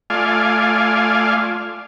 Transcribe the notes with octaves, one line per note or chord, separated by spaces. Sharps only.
A3 F4 D5 F5 G#5